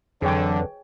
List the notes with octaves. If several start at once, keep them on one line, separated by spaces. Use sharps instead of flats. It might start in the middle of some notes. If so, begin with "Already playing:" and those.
F2 D3 E3 F#3 G#4 C#5 G5